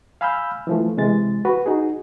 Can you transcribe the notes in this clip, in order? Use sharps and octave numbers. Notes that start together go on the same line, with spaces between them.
F5 G#5 B5 E6 F6 G6
E3 F3 A3
C3 E3 G#3 A6
F#4 B4
D#4 F#4 G#4